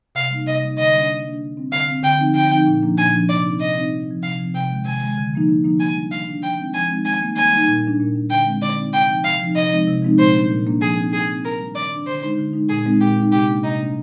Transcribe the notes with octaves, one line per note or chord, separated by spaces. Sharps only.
C3 F5
G3 A#3 D#4
C3 D#5
G3 A#3 D#4
D3 D#5
G3 A#3 D4
D3
G3 A#3 D4
D3
G3 C4
D3 F5
G3 C4
D3 G5
F3 C4 D#4
D3 G5
F3 C4 D#4
A#2
F3 A#3 D4
A#2 G#5
F3 A#3 D4
C3 D5
G3 C4 D#4
C3 D#5
G3 C4 D#4
C3
F3 C4
C3 F5
F3 C4
C3 G5
D#3 G#3
C3 G#5
D#3 G#3
D3
F3 A#3 D#4
D3
F3 A#3 D#4
D#3 G#5
G3 D4
D#3 F5
G3 D4
F3 G5
G#3 C4 D#4
F3 G#5
G#3 C4 D#4
D#3 G#5
G3 A#3 D#4
D#3 G#5
G3 A#3 D#4
A#2
G3 D4
A#2
G3 D4
D3 G5
G#3 C4 D#4
D3 D5
G#3 C4 D#4
C3 G5
F3 C4 D#4
C3 F5
F3 C4 D#4
C3 D#5
F3 G#3 C4 D#4
C3
F3 G#3 C4 D#4
A#2 C5
G3 A#3 D4
A#2
G3 A#3 D4
F3 G#4
C4 D#4
F3 G#4
C4 D#4
D#3 A#4
G3 D4
D#3 D5
G3 D4
D3 C5
G#3 D#4
D3
G#3 D#4
A#2 G#4
G#3 C4 D#4
A#2 G4
G#3 C4 D#4
C3 G4
G3 A#3 D4
C3 D#4
G3 A#3 D4